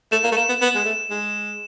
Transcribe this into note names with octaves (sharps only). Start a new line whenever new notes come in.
A3 E7
A#3
A3
A#3 E7
B3
B3
G#3
A3
G#3